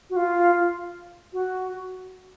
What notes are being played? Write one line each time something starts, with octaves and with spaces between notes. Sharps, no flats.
F#4
F4
F#4